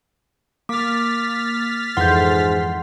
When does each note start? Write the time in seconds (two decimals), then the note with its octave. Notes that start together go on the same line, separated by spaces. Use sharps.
0.69 A#3 D6 F6 A6 B6
1.97 F2 G#2 E3 F#5 C6 G6